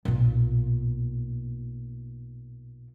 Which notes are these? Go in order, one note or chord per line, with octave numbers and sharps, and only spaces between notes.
B1 A#2